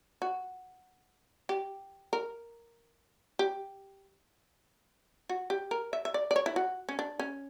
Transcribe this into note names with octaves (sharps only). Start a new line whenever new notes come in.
F#4
G4
A#4
G4
F#4
G4
A#4
E5
E5
D5
D5
C#5
E4
F#4
C#4
D4
C#4